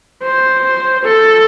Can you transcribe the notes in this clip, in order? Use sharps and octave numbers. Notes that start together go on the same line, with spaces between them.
C5
A4